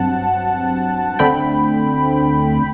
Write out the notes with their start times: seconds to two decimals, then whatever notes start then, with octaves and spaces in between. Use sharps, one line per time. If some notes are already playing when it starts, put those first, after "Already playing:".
Already playing: G2 F#3 C4 F#5 A5
1.19 D2 D3 A3 C4 G5 B5